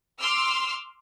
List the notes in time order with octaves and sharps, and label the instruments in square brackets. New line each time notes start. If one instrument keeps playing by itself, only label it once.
[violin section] C6 D6 E6 F6